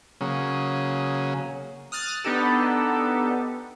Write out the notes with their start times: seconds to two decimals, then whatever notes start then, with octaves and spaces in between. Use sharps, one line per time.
0.21 C#3 F#3 A#3 C#4 G#4
1.92 D#6 F6 F#6 A6
2.24 B3 D4 D#4 G4 A4